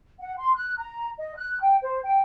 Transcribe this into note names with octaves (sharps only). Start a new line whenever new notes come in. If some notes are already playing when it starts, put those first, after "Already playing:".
F#5
C6
F#6
A#5
D#5
F#6
G5
C5
G5